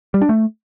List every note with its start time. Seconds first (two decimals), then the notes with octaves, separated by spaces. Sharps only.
0.14 G3
0.22 D4
0.29 A3